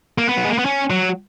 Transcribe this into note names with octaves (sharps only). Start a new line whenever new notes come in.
A#3
B3
F#3
G#3
A#3
B3
C#4
F#3